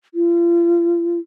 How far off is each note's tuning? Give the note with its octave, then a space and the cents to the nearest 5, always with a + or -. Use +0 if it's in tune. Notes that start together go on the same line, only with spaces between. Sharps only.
F4 -40